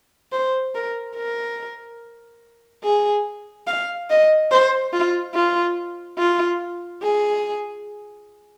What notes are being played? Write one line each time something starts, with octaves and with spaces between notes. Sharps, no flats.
C5
A#4
A#4
G#4
F5
D#5
C5
F4
F4
F4
G#4